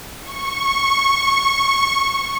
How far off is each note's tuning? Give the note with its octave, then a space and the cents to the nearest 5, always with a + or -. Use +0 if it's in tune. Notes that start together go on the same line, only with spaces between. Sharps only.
C#6 -15